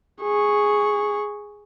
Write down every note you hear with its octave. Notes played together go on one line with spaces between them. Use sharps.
G#4 C#6